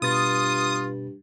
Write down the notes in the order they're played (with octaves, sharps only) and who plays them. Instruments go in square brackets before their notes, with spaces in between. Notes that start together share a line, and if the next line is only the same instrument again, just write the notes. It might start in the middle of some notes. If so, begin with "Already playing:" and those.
[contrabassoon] G2 [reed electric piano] B2 B4 A6 [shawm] F4 [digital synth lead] D#6